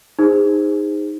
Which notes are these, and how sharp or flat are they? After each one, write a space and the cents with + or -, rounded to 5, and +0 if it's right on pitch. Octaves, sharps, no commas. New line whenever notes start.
D#4 +0 G#4 -30 C5 -15